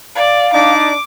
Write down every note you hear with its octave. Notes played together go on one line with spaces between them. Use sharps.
D5 F5
D4 D#4 D5 D6